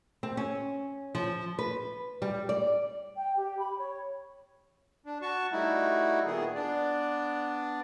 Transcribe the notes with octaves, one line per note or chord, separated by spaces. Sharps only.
C4
C#4
F3
B4
G3
D5
G5
G4
B5
C#5
D4
F#4 A5 C#6
G3 A3 D#4 E4 F#4
A#2 D#3 B3 G#4
B3 D4 D5